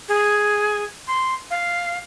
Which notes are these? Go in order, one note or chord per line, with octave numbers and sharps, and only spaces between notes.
G#4
C6
F5